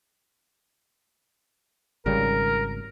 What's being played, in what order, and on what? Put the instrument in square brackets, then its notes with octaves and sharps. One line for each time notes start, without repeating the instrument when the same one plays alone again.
[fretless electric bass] G#1 C#3 G3 [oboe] A#4